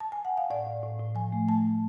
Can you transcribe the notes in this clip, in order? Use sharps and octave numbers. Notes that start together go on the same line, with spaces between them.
A5
G#5
F#5
F5
A2 D5
A2
A2
A2
F3 G#5
A3
A3 A5